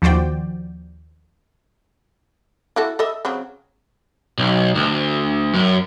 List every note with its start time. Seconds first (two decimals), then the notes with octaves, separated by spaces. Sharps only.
0.02 D#2 F3 F#4 C5 D5 G5
2.76 E4 F#4 A4
2.99 A4 D#5 E5
3.25 C#3 F#3 C4
4.38 B1
4.75 D2
5.55 F#2